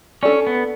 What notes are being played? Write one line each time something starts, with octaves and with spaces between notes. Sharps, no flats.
C#4 D4 A4 D5
B3